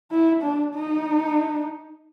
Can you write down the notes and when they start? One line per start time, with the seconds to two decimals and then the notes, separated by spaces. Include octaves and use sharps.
0.11 E4
0.42 D4
0.74 D#4